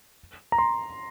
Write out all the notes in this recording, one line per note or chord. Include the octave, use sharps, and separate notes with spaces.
A#5
C6